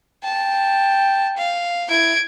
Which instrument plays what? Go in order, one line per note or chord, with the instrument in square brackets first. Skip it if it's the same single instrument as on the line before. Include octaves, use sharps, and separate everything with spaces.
[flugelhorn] G5 [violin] A5
[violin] F5
[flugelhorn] E4 [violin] G#6 D7